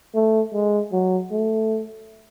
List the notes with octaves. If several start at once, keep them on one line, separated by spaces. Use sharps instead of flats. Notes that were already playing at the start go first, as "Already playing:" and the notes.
A3
G#3
F#3
A3